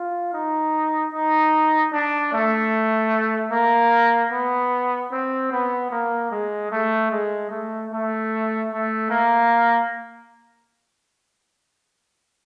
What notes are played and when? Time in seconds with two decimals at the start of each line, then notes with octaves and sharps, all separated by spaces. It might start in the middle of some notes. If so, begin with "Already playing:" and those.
Already playing: F4
0.33 D#4
1.13 D#4
1.93 D4
2.33 A3
3.51 A#3
4.32 B3
5.12 C4
5.51 B3
5.91 A#3
6.31 G#3
6.71 A3
7.11 G#3
7.50 A3
7.91 A3
8.70 A3
9.10 A#3